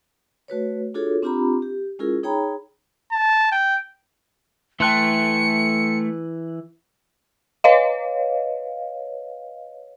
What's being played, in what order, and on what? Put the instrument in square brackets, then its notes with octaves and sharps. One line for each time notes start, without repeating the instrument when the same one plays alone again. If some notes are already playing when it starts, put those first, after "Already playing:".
[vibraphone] A3 F#4 B4 C#5
D4 F4 F#4 G#4 A4 C#5
C4 D4 F4 G4 A#5 B5
G4
G#3 C#4 E4 F4 G#4 A#4
D#4 G#4 C#5 G5 A#5 B5
[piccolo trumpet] A5
G5
[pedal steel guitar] E3 F#6 [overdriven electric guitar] A3 [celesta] G5 A5 C6 [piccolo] C#7
[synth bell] B4 C#5 D#5 F5